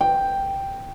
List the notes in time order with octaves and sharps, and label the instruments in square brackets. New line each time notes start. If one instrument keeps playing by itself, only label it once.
[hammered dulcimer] G5